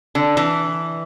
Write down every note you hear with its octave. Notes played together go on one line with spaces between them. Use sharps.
D3
E3